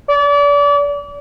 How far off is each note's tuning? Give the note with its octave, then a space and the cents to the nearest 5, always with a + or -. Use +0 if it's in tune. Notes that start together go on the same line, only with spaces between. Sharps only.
D5 -35